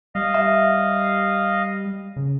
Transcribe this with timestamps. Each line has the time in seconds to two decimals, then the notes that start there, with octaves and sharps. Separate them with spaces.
0.15 G3 D#5 F5
0.34 E5
2.16 C#3